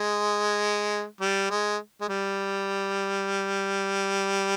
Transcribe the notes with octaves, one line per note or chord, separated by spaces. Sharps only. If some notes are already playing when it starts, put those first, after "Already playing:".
Already playing: G#3
G3
G#3
G#3
G3